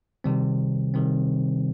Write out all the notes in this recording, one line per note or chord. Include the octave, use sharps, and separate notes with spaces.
C3 D#3 G3 C4
C3 D#3 G3 C4